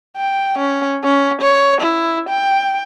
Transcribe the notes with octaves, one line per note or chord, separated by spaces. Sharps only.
G5
C#4
C#4
C#5
E4
G5